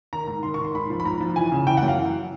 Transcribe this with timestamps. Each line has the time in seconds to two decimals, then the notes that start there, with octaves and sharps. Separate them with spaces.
0.13 D#3 A#5
0.27 G#2
0.43 D#3 C6
0.54 C#6
0.59 D#3
0.65 C6
0.74 G#2 B5
0.90 F3
1.00 B5
1.05 G#2 A#5
1.20 F3
1.36 E3 G#5
1.52 C#3
1.67 E3 G5
1.77 F#5
1.82 F#2
1.88 F5
1.98 E3